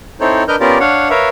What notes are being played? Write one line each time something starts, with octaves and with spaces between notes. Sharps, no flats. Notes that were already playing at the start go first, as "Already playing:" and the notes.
C4 D#4 E4 A4 C5 C#5
D4 A#4 B4 D#5 F6 G6
B3 C#4 F4 G4 A#4 D5
D4 C#5 F5 F#5
A#4 B4 C#5 E5 F5